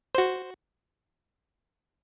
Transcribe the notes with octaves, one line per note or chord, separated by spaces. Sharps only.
F#4 C5